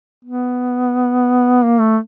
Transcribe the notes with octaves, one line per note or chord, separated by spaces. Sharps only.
B3
A#3
A3